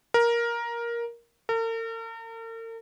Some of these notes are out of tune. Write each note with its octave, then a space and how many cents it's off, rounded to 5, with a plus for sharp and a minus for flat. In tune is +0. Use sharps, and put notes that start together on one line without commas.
A#4 +10
A#4 -45